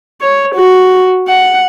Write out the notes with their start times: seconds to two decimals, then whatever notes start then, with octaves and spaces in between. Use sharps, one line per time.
0.22 C#5
0.55 F#4
1.28 F#5